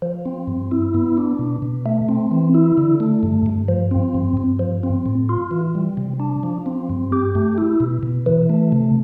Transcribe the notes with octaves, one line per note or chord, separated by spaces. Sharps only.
F3
C4
G2
E4
B3
D4
B2
B2
A3
C4
E3
E4
D3
A3
G2
G2
F3
C4
G2
G2
F3
C4
A2
F4
E3
G3
C3
D4
F3
C4
G2
G4
A3
E4
B2
B2
E3
A3
C3